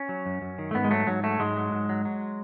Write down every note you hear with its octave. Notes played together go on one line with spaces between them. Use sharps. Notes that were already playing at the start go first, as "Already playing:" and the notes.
Already playing: C#4
F#3
F#2
F#2
D#3
A3
G#2 B3
G#3
F#3 A3
G#2 F#3
F#3 A3
G#2 G#3
F#3
G#2
F#3
F#3